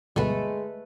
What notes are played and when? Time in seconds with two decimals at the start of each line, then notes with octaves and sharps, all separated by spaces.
0.16 D2 G2 B2 G#3 A3 A4 B4